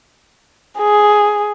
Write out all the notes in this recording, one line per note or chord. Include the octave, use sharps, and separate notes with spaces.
G#4